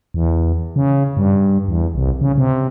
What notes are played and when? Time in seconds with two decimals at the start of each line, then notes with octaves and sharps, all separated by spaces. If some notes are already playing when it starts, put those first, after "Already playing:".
0.14 E2
0.76 C#3
1.17 G2
1.68 E2
1.95 C2
2.21 C#3
2.38 C3